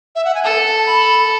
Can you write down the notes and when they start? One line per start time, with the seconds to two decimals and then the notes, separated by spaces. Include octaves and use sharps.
0.16 E5
0.25 F#5
0.35 G#5
0.43 A4 A5
0.79 A5
0.86 B5